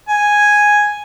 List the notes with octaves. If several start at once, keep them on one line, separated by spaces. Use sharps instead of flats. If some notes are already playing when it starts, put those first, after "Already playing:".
G#5